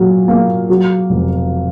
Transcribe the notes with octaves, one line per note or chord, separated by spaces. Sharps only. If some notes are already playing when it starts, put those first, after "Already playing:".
Already playing: A#2 F#3
A#3
F#3
F1